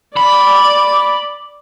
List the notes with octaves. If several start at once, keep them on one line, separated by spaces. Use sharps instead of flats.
D5 B5